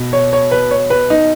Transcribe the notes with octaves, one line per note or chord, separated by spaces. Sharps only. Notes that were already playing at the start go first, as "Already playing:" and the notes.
Already playing: B2
C#5
C#5
B4
C#5
B4
D#4